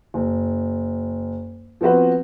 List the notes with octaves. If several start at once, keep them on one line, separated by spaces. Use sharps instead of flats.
F#1
F3 B3 C4 F#4 B4